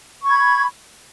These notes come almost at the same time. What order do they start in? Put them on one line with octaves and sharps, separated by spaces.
C#6 G#6 B5